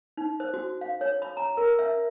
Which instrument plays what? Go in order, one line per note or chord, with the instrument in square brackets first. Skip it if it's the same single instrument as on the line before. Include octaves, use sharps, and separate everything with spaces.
[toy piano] D#4
C5
F#4
F5
C#5
B5
A#5
A#4
E5